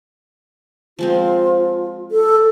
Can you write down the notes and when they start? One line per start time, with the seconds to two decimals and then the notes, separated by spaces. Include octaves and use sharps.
0.99 F3 G#3 C4 F4
2.11 A4